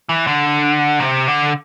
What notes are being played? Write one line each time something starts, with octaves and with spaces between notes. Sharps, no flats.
E3
D3
C3
D3